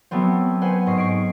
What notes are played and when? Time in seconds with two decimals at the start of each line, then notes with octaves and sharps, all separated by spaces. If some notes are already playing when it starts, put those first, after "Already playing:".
0.11 F#3 A3 B3 C4
0.61 B4 C5 F#5 G#5
0.86 G#2 D#5 C#6 C7
0.98 C#6 C7 D7